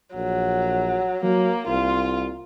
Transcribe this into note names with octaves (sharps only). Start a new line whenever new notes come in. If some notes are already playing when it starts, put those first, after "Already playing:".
A#1 F#3
F#3 A#3
C2 F4